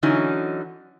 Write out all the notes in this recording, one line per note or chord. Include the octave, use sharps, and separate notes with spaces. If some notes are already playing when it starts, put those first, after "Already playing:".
D3 E3 F#3 C#4 D#4